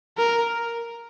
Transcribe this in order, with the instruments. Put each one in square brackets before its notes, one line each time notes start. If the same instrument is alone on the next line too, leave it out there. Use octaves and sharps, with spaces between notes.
[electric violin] A#4